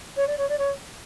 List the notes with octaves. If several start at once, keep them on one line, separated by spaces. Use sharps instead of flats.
C#5
D5
C#5
D5
C#5